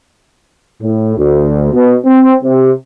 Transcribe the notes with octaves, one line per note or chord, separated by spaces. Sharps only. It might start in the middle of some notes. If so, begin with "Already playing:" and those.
A2
D2
B2
C4
C3